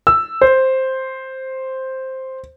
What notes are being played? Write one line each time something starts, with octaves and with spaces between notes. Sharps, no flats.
E6
C5